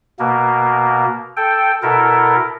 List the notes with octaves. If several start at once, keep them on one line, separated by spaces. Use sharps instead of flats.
B2 A#3
A4 G5
B2 E4 A4 A#4